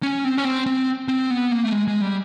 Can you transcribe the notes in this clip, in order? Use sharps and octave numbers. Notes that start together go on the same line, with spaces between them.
C#4
C4
C#4
C4
C4
C4
B3
A#3
A3
G#3
G#3
G3